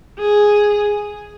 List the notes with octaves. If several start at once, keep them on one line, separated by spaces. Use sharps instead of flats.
G#4